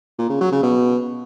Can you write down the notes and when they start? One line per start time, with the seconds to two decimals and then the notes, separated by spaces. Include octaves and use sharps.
0.18 A#2
0.29 C#3
0.41 F#3
0.52 C#3
0.63 B2